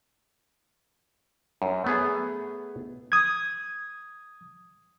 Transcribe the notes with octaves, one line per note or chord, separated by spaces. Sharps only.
F#2
A3 B3 G#4
D#6 G#6